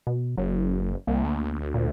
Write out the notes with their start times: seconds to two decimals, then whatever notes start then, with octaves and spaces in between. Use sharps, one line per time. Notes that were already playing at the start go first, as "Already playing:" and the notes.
0.07 B2
0.38 F#1 F#3
1.07 C2 A#3
1.24 D2
1.74 A#2